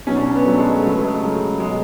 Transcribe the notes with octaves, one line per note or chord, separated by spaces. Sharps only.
B2 F#3 C#4
D4
C#4
B3
B2 F#3 A3
G#3
C#3 F#3 A3
A3
G#3
C#3 F#3
B2 F#3 G#3